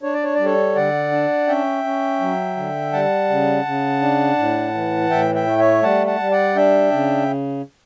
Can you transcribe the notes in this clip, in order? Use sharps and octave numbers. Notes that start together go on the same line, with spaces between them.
D4 C#5
D5
C#5
G3 D5
A4 C#5
D3 D5 F#5
D4
C#4 E5 G5
C#4
F#3
D3
G3 F#5 A5
C#3
C#3
D4
A2
E3
A2 E5 G5
E5 G5
A3
C#5 E5
G3 F#5 A5
F#5 A5
G3
D5 F#5
D4 E5 G5
C#3